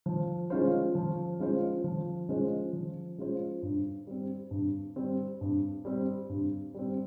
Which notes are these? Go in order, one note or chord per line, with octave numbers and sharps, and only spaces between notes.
F3
G#3 C#4 F4 C5
F3
G#3 C#4 F4 C5
F3
G#3 C#4 F4 C5
F3
G#3 C#4 F4 C5
G2
G3 C4
G2
G3 C4
G2
G3 C4
G2
G3 C4